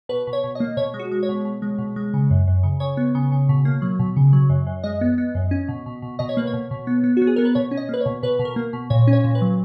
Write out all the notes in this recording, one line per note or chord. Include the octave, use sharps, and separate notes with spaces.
B2 B4
B2
C#5
B2
A#3 D#5
B2 C#5
G#3
F#4
G#3
C#5
B2
B2
G#3
B2
G#3
C#3
F#2
F#2
C#3
C#3 C#5
B3
C#3
C#3
B2
A#3
F#3
B2
C#3
F#3
F#2
F#2
G#3 D#5
B3
B3
F#2
C#4
B2
B2
B2
B2 D#5
C#5
A#3 B4
C#5
B2
B2
B3
B3
F#4
B3
G#4
B3 A#4
B4
B2 C#5
C#4
D#5
A#3 B4
B2 C#5
B2 B4
B2
A#4
A#3
B2
A#2 C#5
C#4
C#5
A#2
B4
F#3